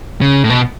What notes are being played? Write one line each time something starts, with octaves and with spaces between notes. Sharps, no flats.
C#3
A2
B2